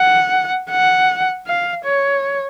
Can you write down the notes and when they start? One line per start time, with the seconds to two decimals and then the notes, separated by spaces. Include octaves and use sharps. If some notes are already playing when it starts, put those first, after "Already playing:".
Already playing: F#5
0.70 F#5
1.47 F5
1.85 C#5